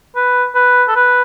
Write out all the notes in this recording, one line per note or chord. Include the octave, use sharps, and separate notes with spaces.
B4
B4
A4
B4